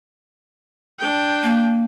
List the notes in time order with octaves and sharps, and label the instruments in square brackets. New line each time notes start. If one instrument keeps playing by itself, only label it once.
[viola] D4 G5
[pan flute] A#3